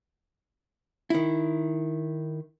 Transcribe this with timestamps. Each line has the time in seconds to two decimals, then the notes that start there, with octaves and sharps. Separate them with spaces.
1.10 D#3 E4